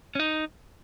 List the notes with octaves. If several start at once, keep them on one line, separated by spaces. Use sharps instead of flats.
C#4
D#4